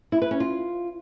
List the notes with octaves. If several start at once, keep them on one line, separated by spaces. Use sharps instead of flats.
E4
B4
C#4
F4